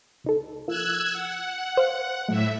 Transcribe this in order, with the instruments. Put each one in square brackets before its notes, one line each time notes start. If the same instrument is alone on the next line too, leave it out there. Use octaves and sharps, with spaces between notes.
[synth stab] C#2 D#4 A4
[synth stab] F3 A#3 [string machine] E6 F#6 G#6
[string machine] F#5
[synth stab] C5 F5
[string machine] A2 E5 [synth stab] F#3 A3